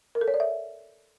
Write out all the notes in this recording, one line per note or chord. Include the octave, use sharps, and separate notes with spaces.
A#4
A4
C#5
D5
E5